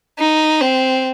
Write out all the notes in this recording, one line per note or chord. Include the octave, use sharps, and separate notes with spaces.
D#4
C4